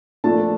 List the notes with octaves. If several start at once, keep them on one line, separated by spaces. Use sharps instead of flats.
A#2 F3 A3 D4 A5